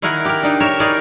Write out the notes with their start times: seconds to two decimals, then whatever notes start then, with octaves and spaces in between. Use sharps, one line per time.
0.02 D#3 E4 G#4 A#4 F#5
0.25 G4 A#4
0.43 D4 D#4
0.60 A#4 C#5 E5
0.80 D#4 E4 G#4 A#4 D5